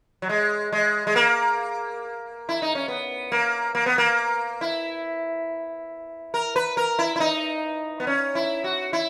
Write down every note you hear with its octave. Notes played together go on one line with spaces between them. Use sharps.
F#3
G#3
G#3
G#3
A#3
E4
D#4
C#4
B3
A#3
A#3
B3
A#3
E4
A#4
B4
A#4
E4
E4
D#4
B3
C#4
E4
F#4
E4